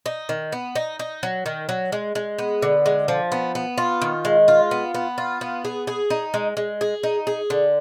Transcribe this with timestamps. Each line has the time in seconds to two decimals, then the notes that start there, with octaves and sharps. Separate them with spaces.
0.06 D#4
0.29 D#3
0.52 B3
0.75 D#4
0.99 D#4
1.23 F#3
1.46 D#3
1.69 F#3
1.92 G#3
2.15 G#3
2.38 B3
2.62 D3
2.86 G#3
3.08 F3
3.32 B3
3.55 B3
3.78 F4
4.02 D#3
4.25 G#3
4.48 F4
4.71 B3
4.94 B3
5.18 F4
5.41 B3
5.65 G#4
5.87 G#4
6.10 D#4
6.34 G#3
6.57 G#3
6.81 G#4
7.03 D#4
7.27 G#4
7.50 D3